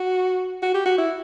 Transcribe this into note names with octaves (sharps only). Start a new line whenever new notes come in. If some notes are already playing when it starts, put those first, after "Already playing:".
Already playing: F#4
F#4
G4
F#4
E4